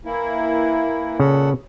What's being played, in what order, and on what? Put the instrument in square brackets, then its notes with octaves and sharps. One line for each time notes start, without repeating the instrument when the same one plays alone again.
[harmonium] E3 A#3 E4
[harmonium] A#2 A4 F#5 [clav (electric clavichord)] C#3